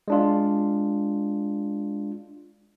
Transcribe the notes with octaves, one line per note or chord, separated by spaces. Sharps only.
G#3 D4 F4